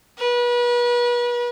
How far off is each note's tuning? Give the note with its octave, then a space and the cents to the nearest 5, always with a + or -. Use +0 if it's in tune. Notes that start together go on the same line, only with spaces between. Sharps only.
B4 -35